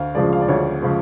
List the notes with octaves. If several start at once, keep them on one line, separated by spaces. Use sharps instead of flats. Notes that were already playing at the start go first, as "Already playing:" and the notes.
Already playing: D2 F5
C#3 F3 G#3 D5
F5
D5
D2 C#5
C#3 F3 G#3